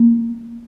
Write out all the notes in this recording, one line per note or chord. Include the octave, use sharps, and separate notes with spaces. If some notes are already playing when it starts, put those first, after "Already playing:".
Already playing: A#3